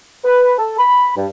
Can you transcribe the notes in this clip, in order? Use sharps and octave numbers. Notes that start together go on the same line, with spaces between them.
B4
A4
B5
G2